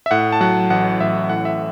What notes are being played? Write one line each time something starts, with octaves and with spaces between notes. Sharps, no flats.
E5
A2 F#5
A5
F#3 F#5
A1 F#5
A1 E5
A2 F#5
E5